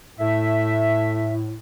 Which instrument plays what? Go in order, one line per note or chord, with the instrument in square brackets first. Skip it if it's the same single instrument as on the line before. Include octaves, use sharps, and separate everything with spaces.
[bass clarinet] A2 [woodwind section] A3 E5